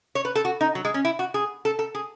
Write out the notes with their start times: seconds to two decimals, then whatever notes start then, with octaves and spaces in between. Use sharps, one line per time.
0.15 C#5
0.25 B4
0.35 A4
0.45 F#4
0.61 D#4
0.75 F#3
0.85 G#3
0.94 C#4
1.05 E4
1.19 F#4
1.34 G#4
1.65 A4
1.79 A4
1.95 G#4